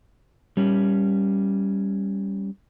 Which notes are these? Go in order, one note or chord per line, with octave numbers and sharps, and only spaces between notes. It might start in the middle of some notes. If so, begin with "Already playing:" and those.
G3 C#4